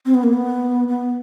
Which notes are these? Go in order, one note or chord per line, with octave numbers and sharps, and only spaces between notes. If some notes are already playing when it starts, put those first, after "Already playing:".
C4
B3
A#3
B3
B3